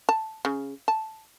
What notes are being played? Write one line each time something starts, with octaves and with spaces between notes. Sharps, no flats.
A5
C#3
A5